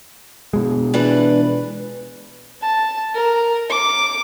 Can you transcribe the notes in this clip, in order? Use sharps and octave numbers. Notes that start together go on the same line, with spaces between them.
B2 G#3
E3 D4 B4
A5
A#4
D6